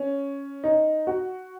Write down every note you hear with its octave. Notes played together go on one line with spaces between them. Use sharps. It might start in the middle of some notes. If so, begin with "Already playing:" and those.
Already playing: C#4
D#4
F#4